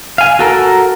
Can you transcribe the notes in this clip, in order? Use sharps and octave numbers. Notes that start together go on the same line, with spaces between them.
F5 G#5
F#4 A4 A#4